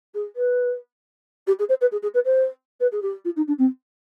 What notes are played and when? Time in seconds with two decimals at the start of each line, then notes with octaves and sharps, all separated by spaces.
0.14 G#4
0.36 B4
1.47 G4
1.59 G#4
1.69 C5
1.81 B4
1.91 G#4
2.02 G#4
2.14 B4
2.25 C5
2.80 B4
2.92 G#4
3.02 G4
3.25 F4
3.36 D#4
3.47 D4
3.58 C4